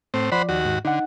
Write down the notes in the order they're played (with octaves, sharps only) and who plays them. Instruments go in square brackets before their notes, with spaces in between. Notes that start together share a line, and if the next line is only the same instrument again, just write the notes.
[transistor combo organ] A2 C4
[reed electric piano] F3 D5 [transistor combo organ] C5 F#5 B5
[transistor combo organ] D#2 F#4
[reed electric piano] G#2
[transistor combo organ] D3 [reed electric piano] D#4 F#5